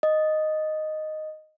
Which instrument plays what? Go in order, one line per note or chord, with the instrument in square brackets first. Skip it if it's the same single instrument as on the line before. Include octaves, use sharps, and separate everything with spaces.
[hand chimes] D#5